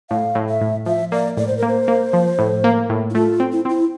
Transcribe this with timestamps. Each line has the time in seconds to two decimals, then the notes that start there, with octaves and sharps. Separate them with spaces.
0.10 A2 F5
0.35 A2
0.49 E5
0.61 A2
0.86 F3 E5
1.12 A#3 D5
1.37 A2 D5
1.47 C5
1.57 A#3 A#4
1.68 C5
1.88 A#3
2.13 F3
2.39 A2
2.64 A#3
2.89 A2
3.10 E4
3.14 A3 F4
3.40 C4
3.52 E4
3.65 C4 E4